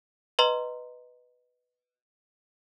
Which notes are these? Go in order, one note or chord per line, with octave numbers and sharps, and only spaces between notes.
B4 D#5 A#5 C6